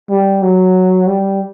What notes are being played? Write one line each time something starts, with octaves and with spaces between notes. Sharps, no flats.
G3
F#3
G3